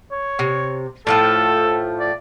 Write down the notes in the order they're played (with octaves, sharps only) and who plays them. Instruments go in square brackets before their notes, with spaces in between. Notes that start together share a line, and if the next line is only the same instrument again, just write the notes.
[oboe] C#5
[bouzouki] C3
[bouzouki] A2 F3 A3 [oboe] A4
[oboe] D5